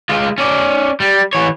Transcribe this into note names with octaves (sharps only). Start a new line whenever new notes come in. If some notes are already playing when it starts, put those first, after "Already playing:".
G#3 F4
C#4 D5
G3
E3 C#5